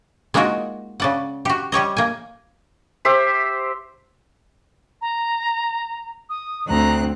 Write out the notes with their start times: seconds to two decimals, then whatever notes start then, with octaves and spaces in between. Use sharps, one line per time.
0.34 G#3 A#3 D#4 F4 F#4 A#4
1.00 C#3 D5 F#5
1.45 F#4 G4
1.72 G3 G4 C#5 D#5
1.97 A#3 G#5
3.05 G4 C5 E5
5.01 A#5
6.29 D#6
6.69 D2 C4 A#5 F#6